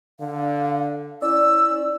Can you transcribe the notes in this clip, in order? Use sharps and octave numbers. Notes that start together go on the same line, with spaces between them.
D3 F5
C#4 E4 D5 E6